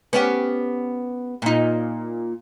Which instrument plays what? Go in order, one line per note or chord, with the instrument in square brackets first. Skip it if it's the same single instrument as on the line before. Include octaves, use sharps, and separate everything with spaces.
[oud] B3 C#4 G4
A#2 D#4